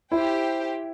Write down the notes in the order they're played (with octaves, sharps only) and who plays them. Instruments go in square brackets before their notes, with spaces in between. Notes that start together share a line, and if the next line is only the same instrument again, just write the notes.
[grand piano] E4 [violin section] G4 C5 G5